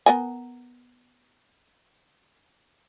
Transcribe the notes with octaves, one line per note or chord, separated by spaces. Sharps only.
B3 A#4 G#5